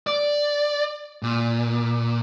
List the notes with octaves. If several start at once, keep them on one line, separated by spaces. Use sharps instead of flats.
D5
A#2